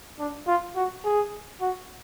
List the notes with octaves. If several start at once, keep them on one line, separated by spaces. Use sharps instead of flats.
D4
F4
F#4
G#4
F#4